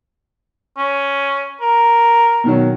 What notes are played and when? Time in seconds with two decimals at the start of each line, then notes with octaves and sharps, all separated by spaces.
0.77 C#4
1.61 A#4
2.44 B2 D#3 F#3